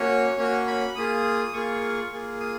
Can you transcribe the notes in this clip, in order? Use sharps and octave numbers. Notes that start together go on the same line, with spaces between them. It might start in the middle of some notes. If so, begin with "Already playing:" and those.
Already playing: A#3 C#4 F#4 C#5
A#3 C#4 F#4 C#5
B5
A#3 F4 G#4 D#6
A#3 F4 G#4 C#6
A#3 F4 G#4
D#6